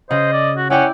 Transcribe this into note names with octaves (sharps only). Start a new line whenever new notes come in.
C#3 C5 D#5
D5
F#4
C#4 E4 D5 F#5 G5